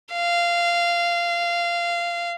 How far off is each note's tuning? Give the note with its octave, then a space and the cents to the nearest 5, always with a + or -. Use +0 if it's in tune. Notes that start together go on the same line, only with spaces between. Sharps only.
F5 -15